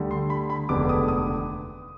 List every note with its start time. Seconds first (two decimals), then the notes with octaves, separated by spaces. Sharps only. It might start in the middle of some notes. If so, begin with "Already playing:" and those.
Already playing: D2 D3 G3
0.11 C6
0.30 B5
0.50 B5
0.69 F1 D#2 D3 G#3 B3 D6
0.89 D#6
1.08 D#6